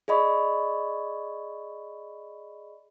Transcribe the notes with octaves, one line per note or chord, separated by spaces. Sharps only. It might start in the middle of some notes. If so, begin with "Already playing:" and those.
G#4 D5 D#5 B5 C#6